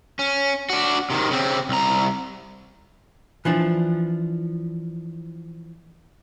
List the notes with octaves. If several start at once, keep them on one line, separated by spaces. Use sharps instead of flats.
C#4
D4 F#4
C3 D#3
C#3 C4
C2 A#5
E3 F3 D4